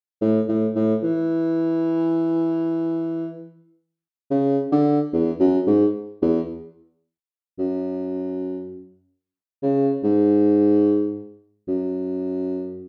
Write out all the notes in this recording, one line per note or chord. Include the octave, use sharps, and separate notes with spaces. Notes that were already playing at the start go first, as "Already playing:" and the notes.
A2
A2
A2
E3
C#3
D3
E2
F#2
G#2
E2
F#2
C#3
G#2
F#2